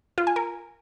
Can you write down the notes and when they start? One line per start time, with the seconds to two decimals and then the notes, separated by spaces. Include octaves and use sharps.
0.18 F4
0.27 G#5
0.36 A#4